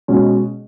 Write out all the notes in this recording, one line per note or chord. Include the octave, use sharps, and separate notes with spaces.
B2 G#3 C#4